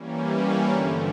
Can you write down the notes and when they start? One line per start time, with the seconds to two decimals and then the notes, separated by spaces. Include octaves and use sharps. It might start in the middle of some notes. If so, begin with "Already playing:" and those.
Already playing: E3 G3 A#3 C#4
0.70 G2 D3 F3 A3